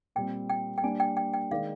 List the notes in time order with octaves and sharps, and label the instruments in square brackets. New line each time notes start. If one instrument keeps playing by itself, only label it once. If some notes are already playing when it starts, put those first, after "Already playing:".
[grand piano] A#2 G3 C4 [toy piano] G5
[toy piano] G5
G5
[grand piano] G3 A#3 D4 [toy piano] G#5
[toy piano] G5
G5
G5
[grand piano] D#3 G#3 D#4 A#4 D5 [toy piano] F5